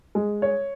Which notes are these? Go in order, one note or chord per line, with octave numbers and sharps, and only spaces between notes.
G#3
C#5